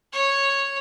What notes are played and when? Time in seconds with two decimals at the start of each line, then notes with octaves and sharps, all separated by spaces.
0.13 C#5